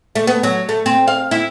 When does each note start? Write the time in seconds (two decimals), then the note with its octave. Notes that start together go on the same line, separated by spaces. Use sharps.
0.15 A3
0.27 B3
0.43 F#3
0.69 A3
0.86 C4
1.08 F5
1.31 E4